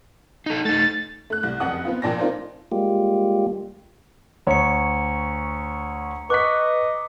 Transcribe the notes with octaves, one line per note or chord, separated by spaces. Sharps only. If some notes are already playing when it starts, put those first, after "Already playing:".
D#4 A4
A3 D#4 A6
A3 F#6
C2 F#6
F#1 F2 F#5 D#6
B3 C4 F4
A#1 A#2 D5 G5 A5 A#6
C4 D#4 F4 A#4 C5 D5
G3 G#3 A#3 F4 G4
D2 C#5 A#5 C#6 C#7
B4 D#5 C#6 D6 F#6 B6